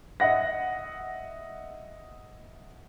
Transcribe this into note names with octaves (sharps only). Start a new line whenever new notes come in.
D#5 E5 F#5 A#6